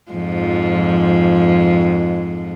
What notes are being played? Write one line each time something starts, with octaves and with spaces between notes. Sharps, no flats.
F2 G#2 F3